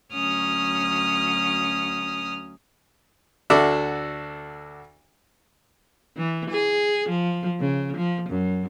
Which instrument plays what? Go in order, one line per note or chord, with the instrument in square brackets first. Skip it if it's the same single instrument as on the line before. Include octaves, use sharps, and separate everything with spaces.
[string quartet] D2 F#3 C#4 D#6 F6
[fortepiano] D2 D4 F#4 A4 E5 D6
[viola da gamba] E3
G#4
F3
C#3
F3
F#2